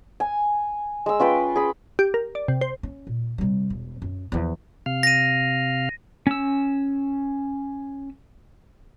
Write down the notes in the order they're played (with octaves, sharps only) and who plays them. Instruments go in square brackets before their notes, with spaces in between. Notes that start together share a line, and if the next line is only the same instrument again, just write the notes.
[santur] G#5
G#3 E6
C#4 F4 B4 G5
G#4 B5
[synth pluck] G4
A#4
D5
C3
C5
[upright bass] C#4
A#2
C3 G3
E1
F#2
E2 F3
[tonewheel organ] C3 F5 F6
[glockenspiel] A#6 D#7
[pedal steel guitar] C#4 E6